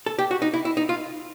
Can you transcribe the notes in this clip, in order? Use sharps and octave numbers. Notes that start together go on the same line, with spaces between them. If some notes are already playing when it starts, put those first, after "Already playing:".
A4
G4
F#4
D#4
E4
E4
D#4
F4